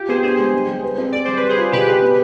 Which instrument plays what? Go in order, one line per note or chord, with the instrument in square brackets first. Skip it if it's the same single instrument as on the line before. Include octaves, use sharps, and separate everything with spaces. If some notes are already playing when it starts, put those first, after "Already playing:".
Already playing: [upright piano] F4 [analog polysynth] G4
[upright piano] B3 [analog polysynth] G#4 C5
[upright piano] D4 [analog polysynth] G#4 C5
[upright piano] G#3
G3
G3
B4
C4
[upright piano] G#4 [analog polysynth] D5
[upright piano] G3 [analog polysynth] C5
[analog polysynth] B4
[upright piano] G3
[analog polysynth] G#4 C5
[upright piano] F4
[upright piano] B2 [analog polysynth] G4 B4
[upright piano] G#4
B3